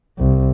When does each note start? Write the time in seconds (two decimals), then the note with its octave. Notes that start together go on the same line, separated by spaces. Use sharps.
0.18 C2